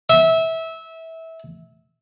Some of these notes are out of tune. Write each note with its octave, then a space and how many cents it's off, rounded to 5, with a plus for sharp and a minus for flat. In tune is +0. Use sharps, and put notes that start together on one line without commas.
E5 -20